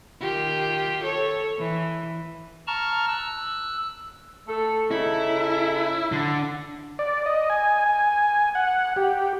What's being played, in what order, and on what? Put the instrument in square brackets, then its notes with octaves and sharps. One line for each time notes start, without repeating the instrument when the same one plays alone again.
[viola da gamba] D#3 F4 G4
A4 C#5
E3
[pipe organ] A5 A#5 C#6 F6
E6 F#6
[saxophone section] A3 A4
[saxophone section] C#3 D#4 A4 [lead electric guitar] E4
[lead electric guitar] D3
[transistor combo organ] D5
D#5
G#5
G#5
F#5
G4